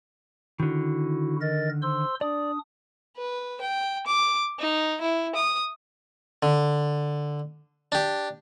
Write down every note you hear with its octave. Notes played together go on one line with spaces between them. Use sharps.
D3 D#3 E4 F#4
A#4 D#5 A6
C5 C6 E6
D4 D5 D#6
B4
G5
D6
D#4
E4
D#6
D3
D4 G4